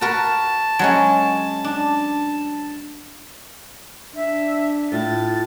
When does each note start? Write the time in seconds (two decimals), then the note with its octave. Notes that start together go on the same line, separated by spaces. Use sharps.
0.01 F#4 A#4 B4 A5
0.79 F#3 G#3 C#4
1.64 D4
4.15 D4 E5
4.92 A2 F4 A6